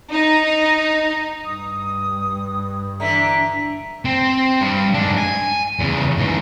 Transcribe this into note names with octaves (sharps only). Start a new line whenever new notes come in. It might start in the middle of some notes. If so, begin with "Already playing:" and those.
D#4
G2 D#6
D3 E3 D4 E5 A#5
C4
G2
G#2 D4
G#5
E2 C#3
G#2 E3